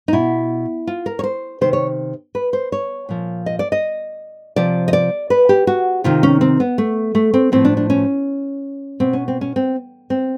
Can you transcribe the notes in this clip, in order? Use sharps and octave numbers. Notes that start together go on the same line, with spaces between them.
D#4
B2 E4
F4
A#4
C#5
C5
C3 D#3 C5
C#5
B4
C5
C#5
A#2 F3
D#5
D5
D#5
C3 F3 D5
D#5
D5
B4
G4
F#4
C3 D#3 F4
C#4
C4
B3
A3
A3
C4
A2 F3 C4
D4
D4
C#4
B2 C4
C#4
C4
C#4
C4
C4